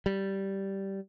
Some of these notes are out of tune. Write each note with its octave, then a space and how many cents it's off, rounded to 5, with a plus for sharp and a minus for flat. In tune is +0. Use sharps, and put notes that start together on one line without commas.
G3 -10